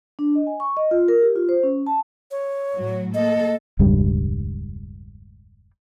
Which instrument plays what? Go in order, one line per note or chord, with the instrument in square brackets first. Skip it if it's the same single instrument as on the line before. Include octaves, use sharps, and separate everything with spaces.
[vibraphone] D4
D#5
G#5
C#6
D#5
F4
A#4
G4
F4
C5
C#4
A5
[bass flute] C#5
[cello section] A2 F#3 F#4
[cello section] A#3 A4 [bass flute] D#5
[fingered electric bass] E1 C#2 G2 G3